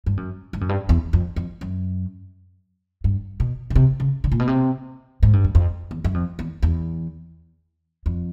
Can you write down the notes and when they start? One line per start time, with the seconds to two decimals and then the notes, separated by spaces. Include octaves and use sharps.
0.06 G2
0.17 F#2
0.53 G2
0.61 F#2
0.69 G2
0.89 E2
1.13 F2
1.36 F2
1.61 F#2
3.04 G2
3.40 B2
3.70 C#3
3.76 C3
4.00 C#3
4.24 D3
4.32 A#2
4.39 B2
4.48 C3
5.23 G#2
5.33 G2
5.44 F#2
5.55 F2
5.91 E2
6.04 F#2
6.14 F2
6.39 E2
6.63 E2
8.06 F2